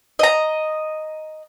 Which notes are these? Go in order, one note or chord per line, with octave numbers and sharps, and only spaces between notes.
D#5 A#5